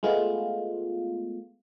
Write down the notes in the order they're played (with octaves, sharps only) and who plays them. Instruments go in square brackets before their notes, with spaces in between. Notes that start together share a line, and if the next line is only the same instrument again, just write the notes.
[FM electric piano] G#3 A3 B3 F4